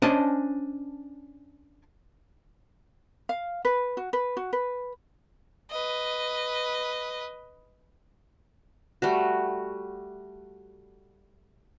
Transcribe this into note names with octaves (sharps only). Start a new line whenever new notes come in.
C#4 D4 C5 D#5 G#5 A5
F5
B4
F#4
B4
F#4
B4
B4 D#5
G3 A3 F#4